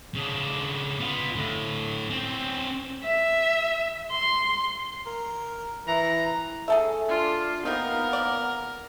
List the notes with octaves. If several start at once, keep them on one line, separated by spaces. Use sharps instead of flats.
C#3 D4
B3 F4
A2 D3
C4 C#4
E5
C6
A#4
E3 A#5
A3 G#4 A4 E5
D4 F4
C3 A#3 B3 D#4 A#4
D5